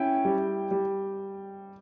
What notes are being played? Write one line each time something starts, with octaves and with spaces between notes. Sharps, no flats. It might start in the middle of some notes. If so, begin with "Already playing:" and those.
Already playing: C#4 E4 G5
G3
G3